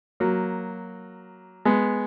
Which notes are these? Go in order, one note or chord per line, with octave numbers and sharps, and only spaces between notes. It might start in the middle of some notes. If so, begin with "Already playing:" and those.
F#3 A#3
G#3 B3